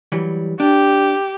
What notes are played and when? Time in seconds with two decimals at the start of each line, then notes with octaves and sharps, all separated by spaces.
0.12 E3 F#3 G3
0.60 D4 G4